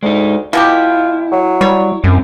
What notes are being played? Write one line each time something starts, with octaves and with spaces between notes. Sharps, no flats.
D2 G#3 D#4
B2 G#3 E4 F4 G4
F#3
G3 C#5
F#2 G3 C4